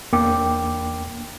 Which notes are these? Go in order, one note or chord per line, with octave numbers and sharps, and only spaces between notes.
E2 A#3 D4 G5 D6